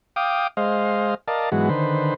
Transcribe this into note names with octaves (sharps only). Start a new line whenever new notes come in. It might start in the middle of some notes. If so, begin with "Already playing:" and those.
F5 G5 D6 D#6
G#3 C5 D#5 F5
A#4 D5 D#5 F5 A5
G#2 E3 F#3 G#3 B3 F#4
D3 D#3 B4 C5